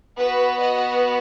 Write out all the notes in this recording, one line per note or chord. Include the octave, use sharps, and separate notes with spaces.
B3 F#4 B4
D#5